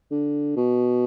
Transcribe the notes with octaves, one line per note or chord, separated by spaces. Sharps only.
D3
B2